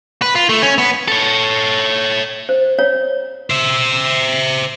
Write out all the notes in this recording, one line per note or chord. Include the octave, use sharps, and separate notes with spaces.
B4
F4
A3
C#4
B3
A4 C#5
C5
C#5
C5 E5